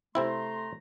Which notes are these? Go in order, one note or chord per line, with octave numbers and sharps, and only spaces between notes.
C3 A3 C4 E4 A#5 C6